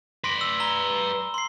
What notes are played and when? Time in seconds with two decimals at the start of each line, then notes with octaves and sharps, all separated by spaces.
0.24 B4 D5 C6 A#6
0.41 E6
0.60 A#5 B5 G7
1.34 C6 C7